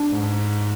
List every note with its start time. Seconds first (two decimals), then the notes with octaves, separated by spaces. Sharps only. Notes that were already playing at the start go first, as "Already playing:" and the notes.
Already playing: D4
0.10 G#2